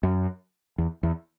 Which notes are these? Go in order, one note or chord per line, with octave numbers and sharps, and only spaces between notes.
F#2
E2
E2